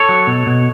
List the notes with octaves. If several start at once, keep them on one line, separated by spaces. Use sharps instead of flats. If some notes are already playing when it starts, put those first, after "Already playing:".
Already playing: A4 C#5
F#3
B2
B2